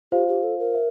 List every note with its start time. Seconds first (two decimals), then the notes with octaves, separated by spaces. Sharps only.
0.12 F4 G4 C5 F5
0.28 G4
0.43 A4
0.59 A#4
0.75 E5